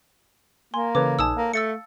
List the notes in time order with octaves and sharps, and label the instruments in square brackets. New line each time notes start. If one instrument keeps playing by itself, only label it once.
[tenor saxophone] A#3 [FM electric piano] G#5 [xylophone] C6
[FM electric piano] C#3 E3 [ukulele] A4 B4 C#5 [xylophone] D6
[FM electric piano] A#1 D#4 G#5 [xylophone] A5 D#6 E6
[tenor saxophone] A#3 [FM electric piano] F5
[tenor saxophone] A3 [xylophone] E6 A6 C#7